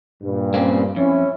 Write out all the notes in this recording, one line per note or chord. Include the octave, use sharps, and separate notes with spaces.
G2 A#2
A#3 C4 C#4
F2 C#4 E4